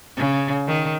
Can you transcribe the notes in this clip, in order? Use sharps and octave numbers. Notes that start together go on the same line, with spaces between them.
C#3
D#3